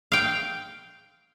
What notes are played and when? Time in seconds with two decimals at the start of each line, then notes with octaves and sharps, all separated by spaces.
0.12 F5 G5